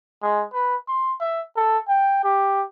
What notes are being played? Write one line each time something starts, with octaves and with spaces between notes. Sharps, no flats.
G#3
B4
C6
E5
A4
G5
G4